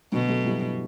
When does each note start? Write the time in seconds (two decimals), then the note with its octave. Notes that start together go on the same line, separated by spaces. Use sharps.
0.12 B2 D3 F#3
0.29 F#3 A3
0.45 E3 G3